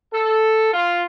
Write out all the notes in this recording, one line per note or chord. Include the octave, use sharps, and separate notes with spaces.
A4
F4